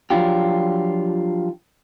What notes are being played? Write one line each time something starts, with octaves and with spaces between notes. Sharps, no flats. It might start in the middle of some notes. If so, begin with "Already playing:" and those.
F3 F#3 D4 F4 G4